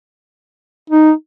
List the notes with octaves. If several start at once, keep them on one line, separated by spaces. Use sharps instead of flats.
D#4